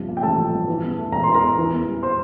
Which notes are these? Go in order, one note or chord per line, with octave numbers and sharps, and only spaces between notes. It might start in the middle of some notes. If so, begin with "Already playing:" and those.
Already playing: G2 C3 F3
A#3
G5
A1 A4 A5
F3
G2
E3
E2
A3
E1 A#5
E3 C6
A#4 A#5
E2
E3
E2
G3
C5 C6